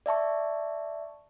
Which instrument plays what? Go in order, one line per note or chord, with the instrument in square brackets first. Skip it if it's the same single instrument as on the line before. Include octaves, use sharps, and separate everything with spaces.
[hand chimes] D5 E5 A5 C#6